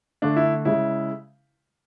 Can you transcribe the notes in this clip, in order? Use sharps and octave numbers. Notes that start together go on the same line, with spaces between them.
D3 A3 D4
E4
C#3 G#3 E4